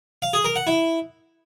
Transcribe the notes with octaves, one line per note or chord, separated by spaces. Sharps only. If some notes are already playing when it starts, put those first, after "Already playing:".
F5
G#4
A#4
F#5
E4